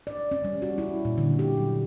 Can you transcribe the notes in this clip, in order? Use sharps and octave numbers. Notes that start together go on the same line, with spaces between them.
D5
C#4
G3
F#4
E4
A#2
D3
G4
F#3